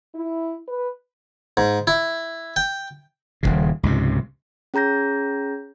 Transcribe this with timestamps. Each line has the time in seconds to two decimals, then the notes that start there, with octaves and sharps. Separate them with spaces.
0.15 E4
0.67 B4
1.57 G#2
1.87 E4
2.56 G5
3.43 D#1 G#1 C#3
3.83 C#2 G#2 C3
4.74 C#4 G#4 A#5 G6 A#6